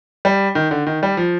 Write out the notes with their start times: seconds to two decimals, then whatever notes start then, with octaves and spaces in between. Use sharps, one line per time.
0.25 G3
0.55 D#3
0.71 D3
0.87 D#3
1.03 G3
1.17 F3